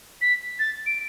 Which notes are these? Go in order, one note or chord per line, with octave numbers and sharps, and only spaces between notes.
B6
A6
D7